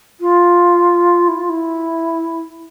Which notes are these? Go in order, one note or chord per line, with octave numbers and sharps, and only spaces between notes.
F4
E4
F4
E4